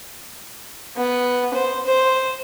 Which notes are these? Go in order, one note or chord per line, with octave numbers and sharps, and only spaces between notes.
B3
C5
C5